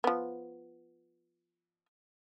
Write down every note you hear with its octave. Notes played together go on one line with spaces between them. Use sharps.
F3 B3